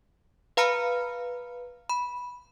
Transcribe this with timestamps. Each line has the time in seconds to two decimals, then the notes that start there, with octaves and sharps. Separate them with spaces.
0.57 B4 F5 A#5 B5 F6 C#7
1.89 B5